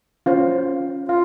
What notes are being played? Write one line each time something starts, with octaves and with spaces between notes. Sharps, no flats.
C#4 F4 C5 F5
F4 F5